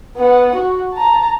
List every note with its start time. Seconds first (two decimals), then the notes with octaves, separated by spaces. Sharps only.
0.18 B3 F#5
0.55 F#4
0.93 A5 A#5